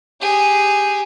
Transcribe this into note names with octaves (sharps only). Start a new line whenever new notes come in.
G4 G#4